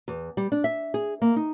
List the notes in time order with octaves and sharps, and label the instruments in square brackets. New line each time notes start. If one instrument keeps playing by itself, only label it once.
[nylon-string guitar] E2
G3
D4
E5
G#4
A#3
D#4